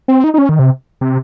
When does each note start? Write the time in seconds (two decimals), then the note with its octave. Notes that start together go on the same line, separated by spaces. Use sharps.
0.08 C4
0.24 D#4
0.34 D#4
0.38 C#4
0.49 D#3
0.59 C3
1.01 C3